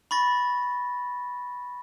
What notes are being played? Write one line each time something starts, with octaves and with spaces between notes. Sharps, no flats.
B5 C#6 A6 A#6